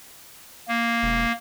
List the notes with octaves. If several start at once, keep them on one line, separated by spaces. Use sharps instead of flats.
A#3
E1